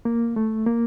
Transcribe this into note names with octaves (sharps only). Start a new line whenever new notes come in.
A#3
A3
A#3